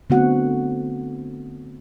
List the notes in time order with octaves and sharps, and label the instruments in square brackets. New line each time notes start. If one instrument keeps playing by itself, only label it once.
[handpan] D3 A3 B3 C4 F#4 F#5